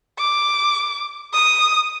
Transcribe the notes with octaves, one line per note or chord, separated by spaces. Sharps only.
D6
D#6